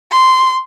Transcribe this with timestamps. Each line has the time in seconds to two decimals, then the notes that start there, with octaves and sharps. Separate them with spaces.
0.11 C6